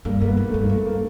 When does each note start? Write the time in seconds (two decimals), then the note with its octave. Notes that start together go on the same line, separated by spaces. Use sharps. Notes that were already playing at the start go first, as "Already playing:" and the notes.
0.05 G2 A#3
0.21 G2 A#3
0.28 B3
0.37 G#2
0.49 G2 A3
0.63 A#3
0.69 F#2 A3
0.86 A#3